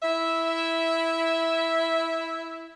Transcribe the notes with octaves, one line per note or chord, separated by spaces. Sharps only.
E4 E5